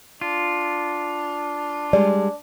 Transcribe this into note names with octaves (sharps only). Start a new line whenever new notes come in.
D4 F4
G3 G#3 D5